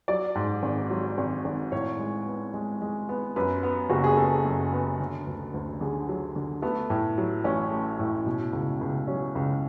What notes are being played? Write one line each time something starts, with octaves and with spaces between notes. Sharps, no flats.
F#3 D5
G#2
G#1
F#3
G#1
G#1
A2 C#5
G#3
B3
G#3
G#3
B3
F#2 B4
B3
F#1 F#4
G#4
B3 A4
F#2
B3
D3
D2
D2
D3 G#4
F#3
D3
A3 B3
A2
F#3
A1 C#4
A3
A2
B2
C#2
C#2
F#3 C#4
C#2